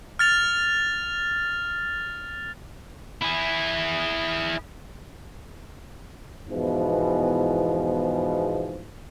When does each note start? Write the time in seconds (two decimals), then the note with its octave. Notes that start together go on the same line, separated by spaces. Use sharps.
0.19 F6 A6 F7
3.22 E4 G#4
6.49 E2 G#2 B2 E3 F3